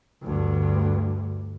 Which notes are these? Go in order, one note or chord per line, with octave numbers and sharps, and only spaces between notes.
D2 G2